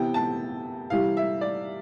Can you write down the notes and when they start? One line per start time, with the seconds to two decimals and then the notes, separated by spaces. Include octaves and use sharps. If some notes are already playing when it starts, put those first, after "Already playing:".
Already playing: C3 E3 B3 G5
0.14 A5
0.90 C3 E3 G3 F5
1.17 E5
1.41 D5